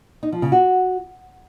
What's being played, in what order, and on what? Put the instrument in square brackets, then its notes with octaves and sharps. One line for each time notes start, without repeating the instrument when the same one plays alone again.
[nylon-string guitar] D#4
F3
C#3
F#4